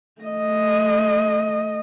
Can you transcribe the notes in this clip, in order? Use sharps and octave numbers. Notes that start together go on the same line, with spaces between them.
A3 D#5